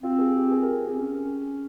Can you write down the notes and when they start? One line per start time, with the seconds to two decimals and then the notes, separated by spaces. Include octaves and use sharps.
0.02 C4 F4
0.19 G#4
0.35 G4
0.51 G#4
0.62 A#4
0.86 C4 G#4
0.99 C#4